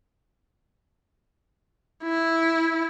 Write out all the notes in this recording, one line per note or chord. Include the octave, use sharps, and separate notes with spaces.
E4